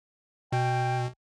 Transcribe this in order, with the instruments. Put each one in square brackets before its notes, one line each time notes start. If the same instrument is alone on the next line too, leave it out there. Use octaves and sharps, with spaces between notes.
[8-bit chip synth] B2 [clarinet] G5